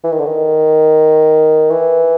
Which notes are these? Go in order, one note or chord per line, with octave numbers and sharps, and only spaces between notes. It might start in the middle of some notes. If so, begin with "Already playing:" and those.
E3
D#3
D3
D#3
E3